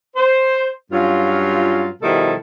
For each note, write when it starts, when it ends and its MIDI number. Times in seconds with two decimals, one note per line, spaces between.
0.16 0.68 72
0.92 1.87 43
0.92 1.87 54
0.92 1.87 61
0.92 1.87 65
2.02 2.34 47
2.02 2.34 51
2.02 2.34 53
2.02 2.34 55
2.02 2.34 64
2.02 2.34 69